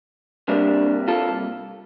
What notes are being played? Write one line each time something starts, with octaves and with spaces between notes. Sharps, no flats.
C2 C3 G3 A#3 D4
F4 A4